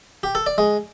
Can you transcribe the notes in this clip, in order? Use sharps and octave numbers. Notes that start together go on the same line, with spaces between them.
G4
A4
D5
G#3